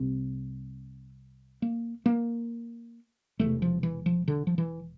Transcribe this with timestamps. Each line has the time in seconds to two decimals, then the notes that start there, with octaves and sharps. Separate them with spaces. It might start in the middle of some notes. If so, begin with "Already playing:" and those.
Already playing: C2 C3 C4
1.62 A#3
2.06 A#3
3.39 E1 E2 C3 A3
3.62 F3
3.83 E3
4.06 F3
4.28 D3
4.47 F3
4.58 E3